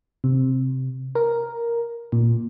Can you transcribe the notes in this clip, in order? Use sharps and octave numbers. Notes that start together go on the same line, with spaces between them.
C3
A#4
A#2